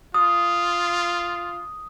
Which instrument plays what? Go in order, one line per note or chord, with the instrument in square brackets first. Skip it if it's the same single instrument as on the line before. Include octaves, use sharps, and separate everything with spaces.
[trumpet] F4 [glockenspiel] D#6